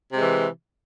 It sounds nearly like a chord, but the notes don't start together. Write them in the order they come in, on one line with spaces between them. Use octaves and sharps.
C3 G#3 E3